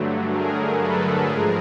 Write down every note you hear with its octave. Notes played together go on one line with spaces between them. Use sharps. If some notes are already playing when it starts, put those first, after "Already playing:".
Already playing: G2 D3 F#3 A3
G#4 A#4
A4 B4
G#2 F3 G#3 G#4 A#4